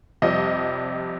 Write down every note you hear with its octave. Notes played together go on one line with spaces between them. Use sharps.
F2 C3 G3 D#5